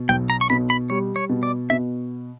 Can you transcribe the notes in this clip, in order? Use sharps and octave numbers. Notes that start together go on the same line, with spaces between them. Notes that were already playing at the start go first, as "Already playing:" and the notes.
Already playing: B2
B1 G5
A#5
C#6
B2 B5
B5
G3 C#5
C#5
B2
D5
B2 E5